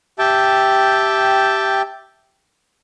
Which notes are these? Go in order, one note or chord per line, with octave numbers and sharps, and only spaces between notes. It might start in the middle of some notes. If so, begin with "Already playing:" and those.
G4 E5 G5 A5